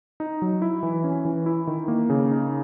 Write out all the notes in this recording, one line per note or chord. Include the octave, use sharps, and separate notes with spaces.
D#4
F#3
E4
E3
C#4
E3
E4
D#3
A#3
C#3
D#4